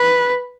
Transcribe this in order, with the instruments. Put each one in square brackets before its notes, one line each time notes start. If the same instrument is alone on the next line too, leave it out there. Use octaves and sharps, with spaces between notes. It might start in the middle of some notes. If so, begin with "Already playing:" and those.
Already playing: [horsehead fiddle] B4